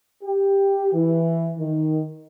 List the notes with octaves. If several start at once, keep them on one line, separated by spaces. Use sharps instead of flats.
G4
E3
D#3